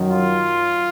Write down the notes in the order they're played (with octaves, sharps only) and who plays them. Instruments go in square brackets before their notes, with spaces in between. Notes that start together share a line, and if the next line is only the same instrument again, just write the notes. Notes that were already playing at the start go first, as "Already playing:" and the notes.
Already playing: [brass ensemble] F#2 D#3 F#3
F4